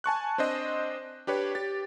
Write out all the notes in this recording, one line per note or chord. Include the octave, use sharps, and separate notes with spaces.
G#5 A5 C#6 F#6
C4 D4 C5 D#5
D4 G4 B4 C#5
G4 A6